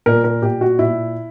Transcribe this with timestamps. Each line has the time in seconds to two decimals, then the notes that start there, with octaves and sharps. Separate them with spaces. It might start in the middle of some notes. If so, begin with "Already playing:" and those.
0.06 A#2 A#4
0.24 A#4
0.42 A#2 G4
0.61 F#4
0.79 A#2 E4